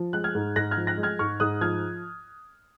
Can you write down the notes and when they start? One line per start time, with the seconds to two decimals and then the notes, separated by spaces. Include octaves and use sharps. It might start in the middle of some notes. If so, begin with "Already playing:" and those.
Already playing: F3
0.13 G#3 F#6
0.24 F6 G#6
0.35 G#2
0.56 G#2 F#6 A#6
0.71 F6 G#6
0.77 F3
0.87 F#6 A#6
0.98 G#3
1.03 F6 G#6
1.19 G#2 C#6 F6
1.40 G#2 D#6 F#6
1.61 F3 F6 G#6